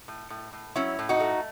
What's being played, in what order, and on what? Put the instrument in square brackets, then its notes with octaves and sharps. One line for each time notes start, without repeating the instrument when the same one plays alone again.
[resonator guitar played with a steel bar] A2
A2
A2
F#3 C#4 E4
A2
D#4 F#4
A3